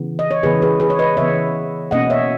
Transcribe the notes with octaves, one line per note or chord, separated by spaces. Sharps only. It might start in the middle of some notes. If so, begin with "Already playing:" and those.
Already playing: C#3 E3 B3
D#5
C#5
C#3 E3 B3 G#4 B4
G#4 B4
G#4 B4
C#5
B4 D#5
C#3 E3 B3 C#5 E5
B2 A#3 C#4 D#5 F#5
C#5 E5